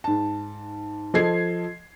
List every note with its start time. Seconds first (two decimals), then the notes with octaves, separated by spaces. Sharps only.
0.04 G#2 A5
1.14 F3 A4 D#5 G#6 C7